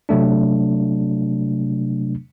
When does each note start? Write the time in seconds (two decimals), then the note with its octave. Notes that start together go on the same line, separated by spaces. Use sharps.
0.09 C3 F#3 A3 D4